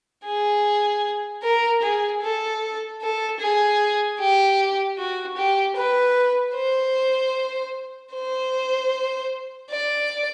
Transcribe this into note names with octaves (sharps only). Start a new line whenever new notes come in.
G#4
A#4
G#4
A4
A4
G#4
G4
F#4
G4
B4
C5
C5
D5